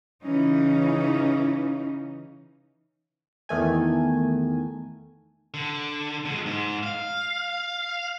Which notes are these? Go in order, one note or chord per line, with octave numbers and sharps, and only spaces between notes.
C#3 E3 C#4 D#4
E2 D#3 A3 G#5
D3
D3 G#3
G#2
F5